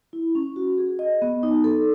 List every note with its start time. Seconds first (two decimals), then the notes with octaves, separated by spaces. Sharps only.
0.13 E4
0.35 C#4
0.56 F#4
0.78 G#4
0.99 D#5
1.22 B3
1.43 D#4
1.64 A4